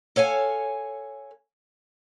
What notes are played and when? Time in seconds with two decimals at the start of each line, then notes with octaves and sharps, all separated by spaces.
0.16 A4 C#5 F5 G#5